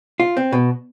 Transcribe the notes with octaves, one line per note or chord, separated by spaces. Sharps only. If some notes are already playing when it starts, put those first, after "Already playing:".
F4
C4
B2